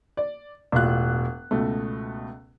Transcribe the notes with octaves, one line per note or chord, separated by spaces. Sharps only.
D5
E1 A2 F4 F#6
C#2 B2 A3